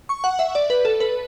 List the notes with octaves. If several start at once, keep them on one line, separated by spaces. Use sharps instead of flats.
C#6
F#5
E5
D5
B4
A4
B4